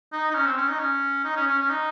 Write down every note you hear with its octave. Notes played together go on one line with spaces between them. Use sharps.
D#4
D#4
C#4
C4
C#4
D#4
C#4
D#4
C#4
C#4
C#4
D#4